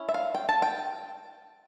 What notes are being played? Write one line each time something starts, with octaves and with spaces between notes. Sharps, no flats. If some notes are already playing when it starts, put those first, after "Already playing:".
Already playing: C#4 E4
E5
F5
G5
A5
G5